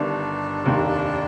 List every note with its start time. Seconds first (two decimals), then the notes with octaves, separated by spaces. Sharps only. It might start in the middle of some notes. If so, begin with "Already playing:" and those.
Already playing: G1 G2 D#3 D4
0.65 F1 D#2 D#3 A#3